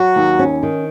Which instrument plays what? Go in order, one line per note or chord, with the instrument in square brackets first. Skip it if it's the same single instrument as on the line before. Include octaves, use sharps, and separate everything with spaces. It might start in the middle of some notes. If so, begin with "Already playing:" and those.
Already playing: [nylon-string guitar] F#3 [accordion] F#4
[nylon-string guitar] D#2
C#4
D#3